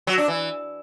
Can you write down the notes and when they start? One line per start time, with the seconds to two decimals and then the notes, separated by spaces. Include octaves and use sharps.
0.07 F#3
0.18 D4
0.28 E3